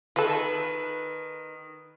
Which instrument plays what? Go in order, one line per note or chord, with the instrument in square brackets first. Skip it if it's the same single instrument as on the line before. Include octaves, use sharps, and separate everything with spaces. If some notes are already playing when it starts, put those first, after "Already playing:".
[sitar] D#3 B4 [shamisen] F4 A4